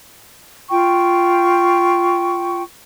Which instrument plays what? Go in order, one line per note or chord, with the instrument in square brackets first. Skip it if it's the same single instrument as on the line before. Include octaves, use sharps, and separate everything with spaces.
[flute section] F4 G5 C#6